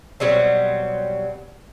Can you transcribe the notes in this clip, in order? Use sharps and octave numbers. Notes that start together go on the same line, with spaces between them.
B2 F#3 G3 C4